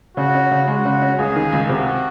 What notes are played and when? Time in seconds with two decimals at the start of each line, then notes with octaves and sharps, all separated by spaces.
0.17 C#3 F#4
0.34 C#4
0.51 C#3
0.67 G#3 F#4
0.85 C#3
1.02 C#4
1.19 C#2 G#4
1.36 D#3
1.52 C#2
1.69 C3 F#4